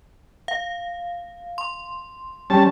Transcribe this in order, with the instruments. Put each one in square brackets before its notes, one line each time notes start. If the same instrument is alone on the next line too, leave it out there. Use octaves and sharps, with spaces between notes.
[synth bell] F5
C6
[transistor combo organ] G3 C#4 A5